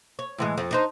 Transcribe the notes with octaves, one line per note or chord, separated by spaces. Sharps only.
C#5
A2 E3 G#3
F2
D4 D#4 C5